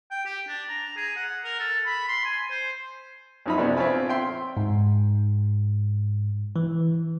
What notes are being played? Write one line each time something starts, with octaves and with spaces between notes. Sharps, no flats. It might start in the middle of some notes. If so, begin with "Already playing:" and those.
G5
G4
D4
A#5
G#4
F#5
A#4
A4
B5
C6
G#5
C5
F#2 F3 D#4 E5 B5
C3 F3 B3 C#4 D4
C4 F4 C#5 E5 G#5 B5
E5 G5 C6
G#2
E3